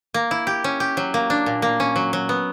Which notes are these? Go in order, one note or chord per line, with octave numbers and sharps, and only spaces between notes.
A#3
E4
G4
C#4
G4
F#3
A#3
D4
A#2
A#3
C#4
F#3
F#3
B3